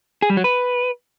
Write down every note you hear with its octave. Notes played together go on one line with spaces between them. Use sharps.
G#4
G3
F#3
B4